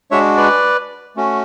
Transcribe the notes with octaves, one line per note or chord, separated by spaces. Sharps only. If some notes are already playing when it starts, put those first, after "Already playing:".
G#3 D4 F#4 C#5 E5
B4 D5
A3 C#4 F#4